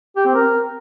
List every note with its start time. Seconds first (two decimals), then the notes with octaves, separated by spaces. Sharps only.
0.16 G4
0.25 C4
0.35 A#4